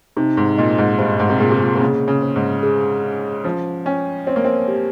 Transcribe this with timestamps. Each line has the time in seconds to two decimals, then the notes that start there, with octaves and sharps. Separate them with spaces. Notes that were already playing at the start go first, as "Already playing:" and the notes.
0.17 C3 D#4
0.37 G#2
0.58 A#2 D#5
0.78 G#2
0.99 G2 C5
1.19 G#2
1.30 C3
1.40 A#2 G#4
1.52 C3
1.60 A#2
1.75 C3
1.80 C#3 A#3
2.08 C#3
2.22 C5
2.36 G#2
2.63 G#4
3.04 C#4
3.44 F3 C#4
3.86 C#4 G5
4.27 C4 C#5
4.36 A#3
4.44 C4
4.68 G4